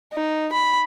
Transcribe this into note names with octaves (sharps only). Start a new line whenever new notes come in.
D#4
B5